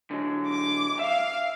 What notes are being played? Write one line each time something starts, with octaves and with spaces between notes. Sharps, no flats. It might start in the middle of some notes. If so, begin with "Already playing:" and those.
D3 F#3 G#3
D6
E5 F5